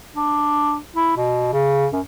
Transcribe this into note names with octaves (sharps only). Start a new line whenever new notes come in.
D4
E4
B2
C#3
F#2